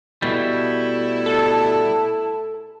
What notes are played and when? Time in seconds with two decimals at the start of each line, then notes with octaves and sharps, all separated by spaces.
0.22 B2 G3 A3 E4
1.26 A4 A5